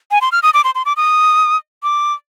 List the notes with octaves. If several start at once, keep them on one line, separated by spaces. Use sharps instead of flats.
G#5
C6
F6
D#6
D6
C6
C6
D6
D#6
D6